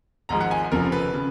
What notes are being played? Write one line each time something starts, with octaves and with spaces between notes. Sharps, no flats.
G#1 G#2 F3 G#3 A#5
F#5
G#5
F1 F2 C#3 F3 A#4
B4
C#3